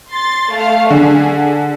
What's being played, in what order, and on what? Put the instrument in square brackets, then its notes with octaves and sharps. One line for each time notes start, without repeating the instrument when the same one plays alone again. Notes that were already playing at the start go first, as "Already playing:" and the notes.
[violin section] C6 A6
A3 F5
[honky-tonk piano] D3 [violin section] G#4